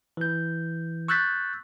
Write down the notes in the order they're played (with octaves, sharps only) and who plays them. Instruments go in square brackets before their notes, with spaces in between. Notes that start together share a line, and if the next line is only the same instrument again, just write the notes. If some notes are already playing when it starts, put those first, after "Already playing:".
[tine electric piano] E3 G6
C#6 E6 F#6 G6 A6 B6